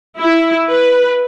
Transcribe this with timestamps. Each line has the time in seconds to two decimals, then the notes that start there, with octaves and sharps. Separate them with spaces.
0.19 E4
0.70 B4